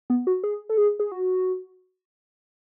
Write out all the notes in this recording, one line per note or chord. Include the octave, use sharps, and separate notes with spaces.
B3
F#4
G#4
A4
G#4
G#4
F#4